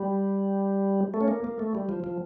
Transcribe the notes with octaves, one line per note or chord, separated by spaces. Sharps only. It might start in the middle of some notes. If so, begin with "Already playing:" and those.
Already playing: G3
A3
C#4
A#3
A#3
A3
G3
F3
F3